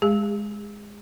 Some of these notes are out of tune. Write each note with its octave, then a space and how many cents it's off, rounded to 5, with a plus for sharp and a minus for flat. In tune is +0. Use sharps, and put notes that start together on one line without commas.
G#3 +0 G#4 -35